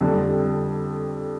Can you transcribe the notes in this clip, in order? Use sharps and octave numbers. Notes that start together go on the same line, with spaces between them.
F2 D3 G3 D4